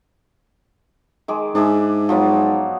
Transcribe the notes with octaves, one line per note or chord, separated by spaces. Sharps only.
D#3 G#3 D6
G#2 D4 G#4 E5
F3 F#3 B3